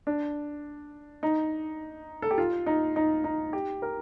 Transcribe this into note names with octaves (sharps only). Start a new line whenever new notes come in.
D4
D#4
A4
G4
F4
D#4
D#4
D#4
G4
A#4